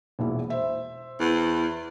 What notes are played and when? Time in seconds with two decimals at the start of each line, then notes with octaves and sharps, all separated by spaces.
0.19 E1 A#1 E4
0.50 C5 E5
1.20 E2